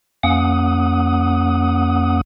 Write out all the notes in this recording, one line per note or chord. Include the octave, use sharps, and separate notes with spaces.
F2 A#3 C#4 F#5 D#6